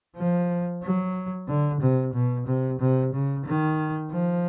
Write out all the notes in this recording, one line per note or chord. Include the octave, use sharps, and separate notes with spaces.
F3
F#3
D3
C3
B2
C3
C3
C#3
D#3
F3